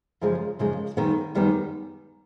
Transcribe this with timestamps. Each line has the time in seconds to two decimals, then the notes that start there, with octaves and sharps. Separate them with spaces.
0.21 F#2 C#3 F3 G#3
0.59 F#2 C#3 F3 G#3
0.97 F#2 D#3 G3 B3
1.35 F#2 D#3 G3 B3